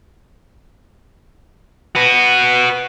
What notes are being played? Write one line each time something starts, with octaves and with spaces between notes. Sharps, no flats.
F#4 B4